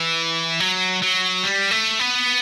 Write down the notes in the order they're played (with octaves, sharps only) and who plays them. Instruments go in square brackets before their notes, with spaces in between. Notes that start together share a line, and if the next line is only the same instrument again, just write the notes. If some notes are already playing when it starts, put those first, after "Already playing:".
Already playing: [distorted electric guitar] E3
F#3
F#3
G3
A3
B3